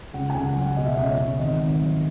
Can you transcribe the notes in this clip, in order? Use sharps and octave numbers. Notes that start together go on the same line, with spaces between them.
C#2 F#5
G#5
C#2
F#5
F#3
F#5
B2 D#5
E5
C#2 D#5
C#5
C#2
G#1 D#5
G#1
F#3